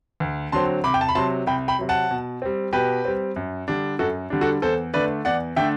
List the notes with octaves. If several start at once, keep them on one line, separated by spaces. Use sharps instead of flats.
D2
D3 F#3 C4 A5 C6
C2 B5 D6
G5
A5
B5
C3 F#3 A5 C6
C2 G5 B5
G5 B5
C3 F#3
F#5 A5
B2
G3 C4
B2 G4 B4
G3 C4
F#2
D3 G3 D4
F#2 F#4 A4
D3 G3 D4
F#4 A4
E2 A4 C5
D3 A3 D4 B4 D5
E2 D5 F#5
D3 A3 D4 E5 G5